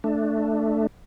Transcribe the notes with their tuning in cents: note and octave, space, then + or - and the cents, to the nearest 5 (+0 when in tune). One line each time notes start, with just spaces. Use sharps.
A3 +0 D4 +10